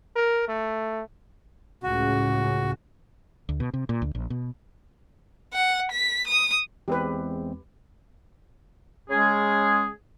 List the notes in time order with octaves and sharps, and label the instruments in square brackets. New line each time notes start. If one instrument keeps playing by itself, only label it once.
[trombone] A#4
A3
[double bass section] C#2 A2 C#3 [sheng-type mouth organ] F#4
[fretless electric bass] D2
B2
C3
A#2
D2
A#1
B2
[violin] F#5
B6
D#6
[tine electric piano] E2 G#3 C4 [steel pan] G4 B4
[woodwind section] C#3 G#3 C#4 G#4